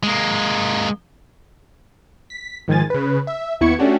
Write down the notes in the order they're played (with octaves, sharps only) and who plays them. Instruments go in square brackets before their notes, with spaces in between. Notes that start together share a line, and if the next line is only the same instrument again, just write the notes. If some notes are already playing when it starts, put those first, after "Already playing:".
[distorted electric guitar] G#3 A#3
[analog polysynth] B6
G#2 D#3 F3 G#5 A6
C#3 B4
E5
D#2 B3 E4 C#6 G#6 C#7
A3 C#4 D4 F#4 G4